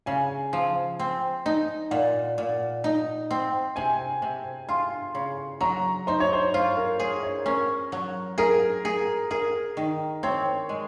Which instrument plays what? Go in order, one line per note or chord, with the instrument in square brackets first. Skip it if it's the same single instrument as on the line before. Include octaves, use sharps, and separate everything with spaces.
[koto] C#3 [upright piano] G#5
[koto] F3
C4
D#4
[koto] A#2 [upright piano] F#5
[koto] A#2
D#4
C4
[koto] C3 [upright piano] G#5
[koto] C3
[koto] F4 [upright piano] C6
[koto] C#3
[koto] F#3 [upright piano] A#5
[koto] D#4 [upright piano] C5
[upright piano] C#5
C5
[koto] F4 [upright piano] C5
[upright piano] A#4
[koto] G#4 [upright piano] C5
[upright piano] C#5
[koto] C#4 [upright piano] A#4
[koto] F#3
[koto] G#4 [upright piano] A#4
[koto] G#4
[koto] G#4 [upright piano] A#4
[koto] D#3
[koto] C4 [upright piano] C#5
[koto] G#3